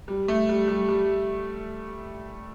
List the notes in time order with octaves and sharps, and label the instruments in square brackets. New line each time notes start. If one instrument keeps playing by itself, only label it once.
[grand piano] G3
A3
G3
G3
G3